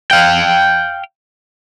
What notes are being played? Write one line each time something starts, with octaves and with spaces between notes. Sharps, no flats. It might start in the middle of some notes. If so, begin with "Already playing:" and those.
F5 G5